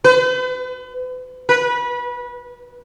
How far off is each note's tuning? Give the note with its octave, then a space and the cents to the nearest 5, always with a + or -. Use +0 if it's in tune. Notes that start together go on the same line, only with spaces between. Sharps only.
B4 +40
B4 -25